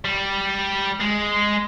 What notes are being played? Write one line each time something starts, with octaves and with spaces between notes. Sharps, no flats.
G3
G#3